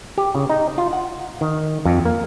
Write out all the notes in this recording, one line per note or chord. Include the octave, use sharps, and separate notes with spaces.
G4
C#3
D#4
F4
F#5
D#3
F2
A#3